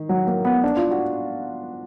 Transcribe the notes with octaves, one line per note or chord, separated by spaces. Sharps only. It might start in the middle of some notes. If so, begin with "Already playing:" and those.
Already playing: D#3
F#3
A#3
B3
D4
F4
F#4